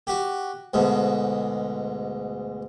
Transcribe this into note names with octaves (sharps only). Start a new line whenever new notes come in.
F#4 G4
D2 G#2 B2